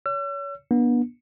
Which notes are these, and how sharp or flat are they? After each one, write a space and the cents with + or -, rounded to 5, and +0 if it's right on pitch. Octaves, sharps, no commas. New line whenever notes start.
C#5 +30 E6 +40
B3 -40 D4 +0